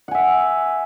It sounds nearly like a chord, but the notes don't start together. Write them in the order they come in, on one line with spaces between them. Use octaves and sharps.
F#5 G#5 E5